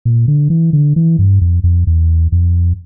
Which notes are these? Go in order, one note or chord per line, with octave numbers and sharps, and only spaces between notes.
A#2
D3
E3
D3
E3
G2
F2
F2
E2
F2